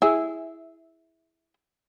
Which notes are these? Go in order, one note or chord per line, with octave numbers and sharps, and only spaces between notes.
E4 G#4